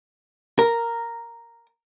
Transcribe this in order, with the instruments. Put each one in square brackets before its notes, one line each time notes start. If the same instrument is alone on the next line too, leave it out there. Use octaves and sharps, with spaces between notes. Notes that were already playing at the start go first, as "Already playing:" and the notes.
[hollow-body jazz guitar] A#4